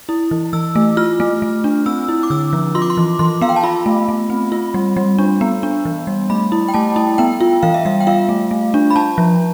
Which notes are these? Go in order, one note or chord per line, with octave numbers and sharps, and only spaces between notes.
E4
E3
E3 E6
A3
F4 F6
A3
A3
D4
C4 E6
E4
D6
D3 E6
F3
F4 C6
D6
C6
E3
E3 C6
B3 F5
G5
A5
F4 B5
A3
A3
C4
F4
G3
G3
D4
B3
D4
E3
G3
A3 B5
E4
G5
A3 A5
E4
B3 G5
F4
E3 F5
E5
G3 F5
G5
F4 F5
A3
A3
D4
B5
D4 A5
F3